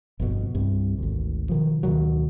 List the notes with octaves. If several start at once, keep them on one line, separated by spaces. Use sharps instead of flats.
G1 F2 B2
C2 G2 C3
G#1 D2
B2 D#3 F3
D2 B2 D#3 F#3